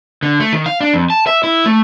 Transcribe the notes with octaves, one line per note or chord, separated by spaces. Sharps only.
D3
A3
D#3
F5
D4
F2
A5
E5
E4
A3